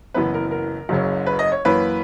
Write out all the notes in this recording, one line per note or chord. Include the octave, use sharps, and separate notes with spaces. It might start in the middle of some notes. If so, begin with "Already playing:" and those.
F#1 F#2 E3 B3 B4
A#4
A#4
F#1 F#2 C#3 F#3 C#4
B4
D#5
C#5
F#2 E3 A#3 C#4 B4